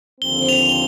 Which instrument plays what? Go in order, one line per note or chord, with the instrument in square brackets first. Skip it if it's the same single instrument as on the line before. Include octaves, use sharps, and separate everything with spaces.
[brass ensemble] D#2 D3 F3 C4 [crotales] G7
[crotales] F7
G7